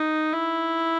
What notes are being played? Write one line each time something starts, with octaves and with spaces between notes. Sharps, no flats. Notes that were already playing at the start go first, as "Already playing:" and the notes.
Already playing: D#4
E4